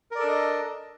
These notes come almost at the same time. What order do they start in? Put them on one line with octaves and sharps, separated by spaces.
A#4 D5 A4 D4 D#5